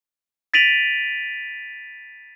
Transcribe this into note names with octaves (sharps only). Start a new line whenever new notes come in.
A6 B6 D7 D#7 F7 F#7